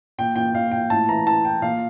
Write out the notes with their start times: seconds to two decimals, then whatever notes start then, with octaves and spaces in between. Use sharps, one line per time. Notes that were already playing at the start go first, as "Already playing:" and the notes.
0.18 A#2 G5
0.36 A#2 G5
0.54 A#2 F5
0.72 A#2 G5
0.90 A2 A5
1.08 E3 A#5
1.26 E3 A5
1.44 E3 G5
1.62 A#2 F5